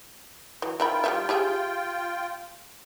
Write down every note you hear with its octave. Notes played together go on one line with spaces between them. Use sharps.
E3 F#3
D#3 F4 E5 G5 B5
G3 A#3 E5
G4 G#4 E5